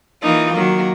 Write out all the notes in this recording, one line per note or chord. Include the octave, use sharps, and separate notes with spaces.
E3 A#3 D#4 F4
D#3 F#3 A#3